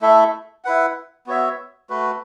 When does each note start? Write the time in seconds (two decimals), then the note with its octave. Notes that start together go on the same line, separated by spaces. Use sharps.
0.02 A3 E4 A4 E5
0.65 E4 B4 F#5
1.27 B3 F#4 C#5 E5
1.90 A3 F#4 B4